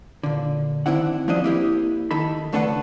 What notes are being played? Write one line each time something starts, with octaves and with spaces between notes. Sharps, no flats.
A#2 D3
D#3 C4 D4 E4 F#5
F3 G3 C4 D4 D#5
A#3 E4 G4
D#3 D#4 A4 B5
C#2 A3 D4 A4 B4 F#5